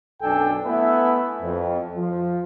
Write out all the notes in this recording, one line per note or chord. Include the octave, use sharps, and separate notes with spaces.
B1 F#2 D4 A4 G5 G#5
A3 B3 E4 B4 E5 G#5
F2
F3